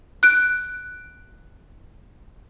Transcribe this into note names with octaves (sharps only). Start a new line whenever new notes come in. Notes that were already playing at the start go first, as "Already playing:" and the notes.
F#6 D7